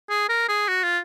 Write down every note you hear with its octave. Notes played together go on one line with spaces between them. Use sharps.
G#4
A#4
G#4
F#4
F4